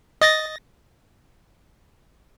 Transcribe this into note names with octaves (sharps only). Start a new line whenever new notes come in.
D#5 A6 A#6